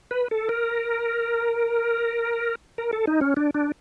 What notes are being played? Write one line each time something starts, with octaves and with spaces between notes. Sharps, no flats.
B4
A4
A#4
A#4
A4
D#4
C#4
D4
D4